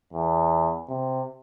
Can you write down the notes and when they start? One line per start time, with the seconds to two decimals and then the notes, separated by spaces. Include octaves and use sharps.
0.13 E2
0.89 C3